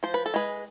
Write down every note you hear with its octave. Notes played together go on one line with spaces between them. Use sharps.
F3 C5
B4
A4
G#3 G#4 B4